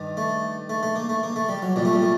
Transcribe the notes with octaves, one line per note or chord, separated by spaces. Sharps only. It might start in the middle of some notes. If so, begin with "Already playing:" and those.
Already playing: G2 D#3
A3
A3
A3
A#3
A3
A#3
A3
G3
F#3
C2 A#2 G3
A3
G3
A3